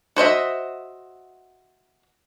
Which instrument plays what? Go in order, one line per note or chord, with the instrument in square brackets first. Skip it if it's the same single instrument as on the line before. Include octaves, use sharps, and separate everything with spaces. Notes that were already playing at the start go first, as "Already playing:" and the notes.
[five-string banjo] F#4 C5 D#5 E5